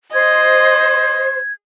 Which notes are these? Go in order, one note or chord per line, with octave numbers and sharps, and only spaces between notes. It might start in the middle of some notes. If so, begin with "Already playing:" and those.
C5 D#5 G#6